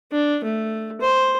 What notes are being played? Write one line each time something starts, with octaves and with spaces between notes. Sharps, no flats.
D4
A3
C5